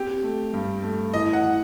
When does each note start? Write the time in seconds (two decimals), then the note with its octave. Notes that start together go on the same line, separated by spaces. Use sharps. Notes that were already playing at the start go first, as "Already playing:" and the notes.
Already playing: C4 G4
0.23 A3
0.53 G2
0.83 A3
1.13 E3 D#5
1.33 F#5
1.43 E3